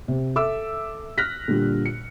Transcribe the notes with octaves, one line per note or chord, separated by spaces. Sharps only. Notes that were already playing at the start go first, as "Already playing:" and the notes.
C3
A4 E5 D6 E6
F6 F#6 A#6 B6
A#2 D3 G3
C#7